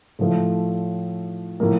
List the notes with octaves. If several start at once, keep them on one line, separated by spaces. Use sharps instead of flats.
A2 F3 A3
A2 F3 A#3